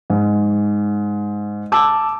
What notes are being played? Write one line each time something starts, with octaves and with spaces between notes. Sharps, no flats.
G#2
A5 D6 E6